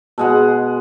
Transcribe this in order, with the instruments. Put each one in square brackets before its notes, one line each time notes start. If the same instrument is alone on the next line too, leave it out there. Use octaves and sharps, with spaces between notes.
[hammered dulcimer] B2 G#3 F#5